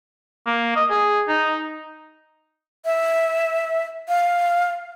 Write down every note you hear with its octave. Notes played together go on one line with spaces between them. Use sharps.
A#3
D#5
G#4
D#4
E5
F5